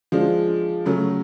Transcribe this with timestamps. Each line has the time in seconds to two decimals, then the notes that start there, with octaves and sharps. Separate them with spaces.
0.12 F3 G#3 D4
0.86 C#3 F#3 A3 C#4